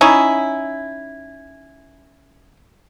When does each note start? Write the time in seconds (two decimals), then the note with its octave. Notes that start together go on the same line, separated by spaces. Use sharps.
0.01 C#4 D#4 E4